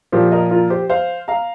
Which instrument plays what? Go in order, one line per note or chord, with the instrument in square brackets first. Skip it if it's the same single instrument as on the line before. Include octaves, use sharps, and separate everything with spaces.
[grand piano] A#2 F3 A#3 G4 C5
A#4 D#5
F4 A#4
G4 C5
C5 F5
F5 A#5